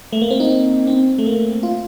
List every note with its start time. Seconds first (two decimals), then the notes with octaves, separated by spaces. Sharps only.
0.12 A3
0.22 A#3
0.31 C4
0.40 D#4
0.87 C4
1.18 A3
1.26 A#3
1.63 F4